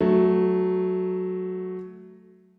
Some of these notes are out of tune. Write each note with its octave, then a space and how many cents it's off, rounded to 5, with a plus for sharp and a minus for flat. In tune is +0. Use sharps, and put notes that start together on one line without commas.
F#3 +0 A3 -10